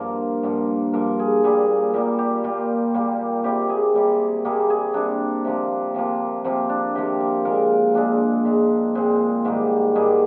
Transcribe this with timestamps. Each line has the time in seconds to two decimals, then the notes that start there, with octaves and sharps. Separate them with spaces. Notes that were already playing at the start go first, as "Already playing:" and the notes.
Already playing: G2 F3 A#3 F4 A#4
0.43 G2 F3 A#3
0.93 G2 F3 A#3 A#4
1.19 G#4
1.44 A#2 G3 A#3 G#4
1.94 A#2 G3 A#3 A#4
2.19 G4
2.44 A#2 G3 A#3 F4
2.94 A#2 G3 A#3
3.44 C3 G3 A#3 G4
3.69 G#4
3.94 C3 G3 A#3
4.45 C3 G3 A#3 G#4
4.70 G#4
4.94 C3 G3 A#3 D4
5.45 C3 F3 A#3
5.94 C3 F3 A#3
6.44 C3 F3 A#3 C4
6.69 D4
6.95 C3 F3 A#3 G4
7.20 A#4
7.45 A#2 G#3 A#4
7.94 A#2 G#3 D4
8.45 A#2 G#3
8.95 A#2 G#3 C4
9.45 G#2 D#3 G3 A#3
9.95 G#2 D#3 G3 A#3 G#4